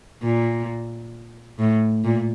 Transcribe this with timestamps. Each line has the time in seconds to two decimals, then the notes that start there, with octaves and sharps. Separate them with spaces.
0.23 A#2
1.59 A2
2.04 A#2